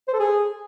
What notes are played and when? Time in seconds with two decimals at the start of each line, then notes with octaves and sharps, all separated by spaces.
0.08 C5
0.14 A4
0.20 G#4